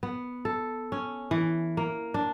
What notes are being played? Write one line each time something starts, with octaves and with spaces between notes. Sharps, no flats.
B3
A4
C#4
E3
A#3
D4